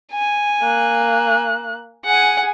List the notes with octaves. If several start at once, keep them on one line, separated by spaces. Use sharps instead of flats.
G#5
A#3 F#6
G#4 F#5 G#5